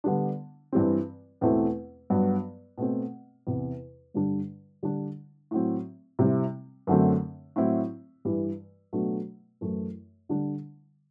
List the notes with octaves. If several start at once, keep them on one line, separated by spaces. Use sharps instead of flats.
D3 G3 B3 D4
G2 E3 G3 C4
E2 B2 A3 C4 E4
G2 F#3 B3
B2 A3 C4
E2 C3 E3
G2 D3 G3 D4
D3 G3 D4
A2 F#3 C4
C3 G3 C4 E4
F#2 D3 F#3 A3 C4
A2 F#3 C4 E4
G2 E3 G3
B2 F#3 A3 D4
F#2 E3 A3 E4
D3 G3 D4